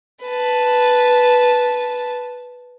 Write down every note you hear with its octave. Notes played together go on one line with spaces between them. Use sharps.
B4 A5